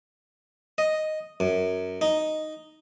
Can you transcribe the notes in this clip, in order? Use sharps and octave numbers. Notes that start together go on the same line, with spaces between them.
D#5
F#2
D#4